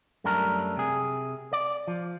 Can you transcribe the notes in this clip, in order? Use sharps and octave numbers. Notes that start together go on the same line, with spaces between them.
F#2 G3 A3 D4 A#4
C3 G#4
D5
F3